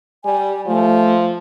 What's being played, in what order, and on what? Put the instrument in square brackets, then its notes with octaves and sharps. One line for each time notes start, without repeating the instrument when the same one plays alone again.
[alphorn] G3 [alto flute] G#5
[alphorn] F3 [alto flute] A3